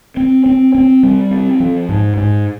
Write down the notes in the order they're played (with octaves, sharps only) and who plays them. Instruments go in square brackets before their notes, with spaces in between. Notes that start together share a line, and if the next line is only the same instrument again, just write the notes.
[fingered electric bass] C4
C4
C4
G3
C4
F3
G#2
G#2